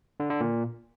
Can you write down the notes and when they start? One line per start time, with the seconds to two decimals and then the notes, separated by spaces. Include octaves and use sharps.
0.20 D3
0.30 D3
0.41 A#2